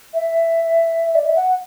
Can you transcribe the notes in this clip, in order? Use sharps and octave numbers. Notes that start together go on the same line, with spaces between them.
E5
D5
E5
F#5